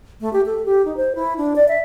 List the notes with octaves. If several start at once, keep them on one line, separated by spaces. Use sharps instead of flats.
A3
G4
A4
G4
D#4
C5
E4
D4
D5
E5